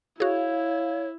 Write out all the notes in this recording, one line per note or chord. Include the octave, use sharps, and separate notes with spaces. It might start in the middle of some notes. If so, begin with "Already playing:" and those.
E4 F#4 G#4 C#5 F5